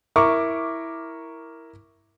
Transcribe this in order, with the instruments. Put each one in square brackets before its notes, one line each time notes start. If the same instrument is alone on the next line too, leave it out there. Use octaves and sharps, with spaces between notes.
[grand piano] E4 A#4 C#6 D6